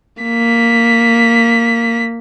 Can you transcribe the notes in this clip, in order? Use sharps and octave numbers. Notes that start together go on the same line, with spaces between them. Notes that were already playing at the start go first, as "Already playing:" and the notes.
A#3 B6